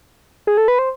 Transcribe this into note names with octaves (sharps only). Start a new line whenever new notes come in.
G#4
A4
B4
C5